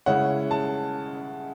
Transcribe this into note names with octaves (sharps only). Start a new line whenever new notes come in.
C#3 G#3 C#4 E4 F#5
A5